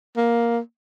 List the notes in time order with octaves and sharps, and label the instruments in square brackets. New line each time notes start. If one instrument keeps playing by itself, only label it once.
[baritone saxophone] A#3